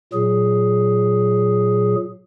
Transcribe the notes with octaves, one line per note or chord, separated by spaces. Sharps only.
A#2 F#3 G#4